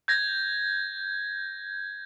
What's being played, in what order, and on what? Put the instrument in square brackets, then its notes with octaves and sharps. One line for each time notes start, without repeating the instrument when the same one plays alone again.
[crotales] G6 G#6 A#6